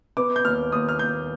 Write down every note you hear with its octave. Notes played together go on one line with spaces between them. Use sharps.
B3 D6
G6
D#2 F6
D#2 D#6
F6
D#2 G6